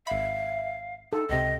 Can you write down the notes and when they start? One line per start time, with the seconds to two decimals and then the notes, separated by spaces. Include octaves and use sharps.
0.07 G#1 E5 F5 B5
1.13 D#4 A4
1.29 C#2 C3 D#5 G5